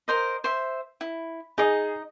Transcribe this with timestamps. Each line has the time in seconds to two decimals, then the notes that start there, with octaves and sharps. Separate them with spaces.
0.08 A#4 C5 D#5
0.44 C5 E5
1.01 E4
1.58 D#4 G#4 D#5